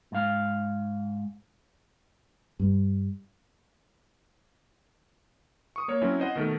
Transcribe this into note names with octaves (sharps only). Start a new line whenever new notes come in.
G#2 F5
G2
C#6 D#6
A#3 C#5
F#3 C4 C#4 E4
C5 D#5 F#5
B2 D#3 A3